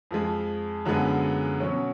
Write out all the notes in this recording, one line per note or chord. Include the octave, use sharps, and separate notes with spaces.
F2 F3 G#3
F#2 D3 F3 G#3 B3
B2 F#3 C#4